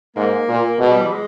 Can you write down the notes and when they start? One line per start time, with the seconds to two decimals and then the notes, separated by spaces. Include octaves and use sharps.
0.16 G#2 A#3
0.49 A#2
0.80 B2 G#3
0.91 G3
1.01 E3
1.11 G#3